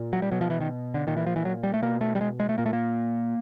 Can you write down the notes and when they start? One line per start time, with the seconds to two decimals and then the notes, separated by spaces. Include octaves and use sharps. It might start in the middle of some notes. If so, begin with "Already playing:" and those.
Already playing: A#2
0.13 F#3
0.22 G3
0.32 B2 F#3
0.41 F3
0.50 E3
0.61 D#3
0.94 D3
1.07 A#2 D#3
1.17 E3
1.27 F3
1.36 E3
1.45 F#3
1.63 G3
1.74 A3
1.82 B2 A#3
2.01 A3
2.15 G3
2.21 G#3
2.40 G#3
2.49 A3
2.58 A#2 A#3
2.66 A3
2.73 A#3